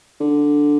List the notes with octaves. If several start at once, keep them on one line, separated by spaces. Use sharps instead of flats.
D3